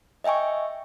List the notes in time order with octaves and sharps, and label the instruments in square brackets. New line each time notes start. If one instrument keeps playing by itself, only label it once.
[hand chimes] D#5 E5 G5 G#5 C#6